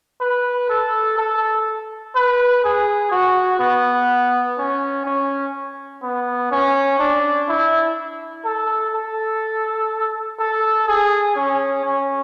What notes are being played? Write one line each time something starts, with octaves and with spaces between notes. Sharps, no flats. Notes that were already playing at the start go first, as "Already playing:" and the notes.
B4
A4
A4
B4
G#4
F#4
B3
C#4
C#4
B3
C#4
D4
E4
A4
A4
A4
G#4
C#4
C#4